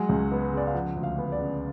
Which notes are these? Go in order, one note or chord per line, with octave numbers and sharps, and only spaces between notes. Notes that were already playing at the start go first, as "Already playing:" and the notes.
Already playing: F#3 G#3 F#5
C#2
B3
C#3 D5
F5
F3 F#5
D2
F5
B3
D5
C#3